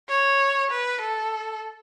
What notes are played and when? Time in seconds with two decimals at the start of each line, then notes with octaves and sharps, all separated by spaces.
0.09 C#5
0.71 B4
1.01 A4